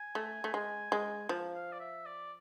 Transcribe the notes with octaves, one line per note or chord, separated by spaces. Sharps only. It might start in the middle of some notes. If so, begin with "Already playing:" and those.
Already playing: G#5
A3
A3
G#3
G#3
F3
F5
D5
E5
D5